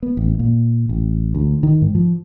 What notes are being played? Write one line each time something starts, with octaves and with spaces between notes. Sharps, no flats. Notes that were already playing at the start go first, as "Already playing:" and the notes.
B3
A1
A#2
A1
D2
D#3
G#2
F3